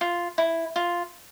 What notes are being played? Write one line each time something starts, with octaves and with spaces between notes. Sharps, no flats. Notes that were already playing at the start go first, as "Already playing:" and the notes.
F4
E4
F4